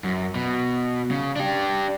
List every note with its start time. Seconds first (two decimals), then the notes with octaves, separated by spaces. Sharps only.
0.04 F#2
0.35 B2
1.11 C#3
1.36 D4 G4